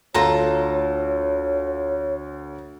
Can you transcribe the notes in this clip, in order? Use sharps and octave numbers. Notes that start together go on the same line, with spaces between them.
D2 F4 A4 C#5 A#5